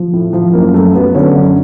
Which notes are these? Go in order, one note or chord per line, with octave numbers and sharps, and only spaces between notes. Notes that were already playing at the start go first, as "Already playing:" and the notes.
Already playing: F3
A2
F3
F#2 A#3
F#2 A3
F#3 B3
D3 C#4
F#2